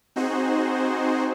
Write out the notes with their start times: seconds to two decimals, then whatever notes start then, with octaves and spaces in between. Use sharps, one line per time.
0.16 C4 D#4 F#4 G#4 C5